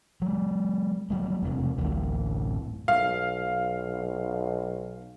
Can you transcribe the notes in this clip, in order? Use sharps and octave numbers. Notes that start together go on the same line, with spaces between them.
F#3 G#3
F#3 G3 A3
E1 C3
D1 A1 A2
B1 F5